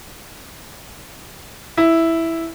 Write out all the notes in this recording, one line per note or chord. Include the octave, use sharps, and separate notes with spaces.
E4